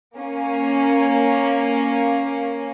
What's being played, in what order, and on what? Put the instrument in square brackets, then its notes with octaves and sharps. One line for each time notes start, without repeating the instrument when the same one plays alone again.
[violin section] A#3 C#4